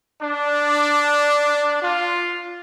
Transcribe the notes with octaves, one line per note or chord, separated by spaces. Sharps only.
D4
F4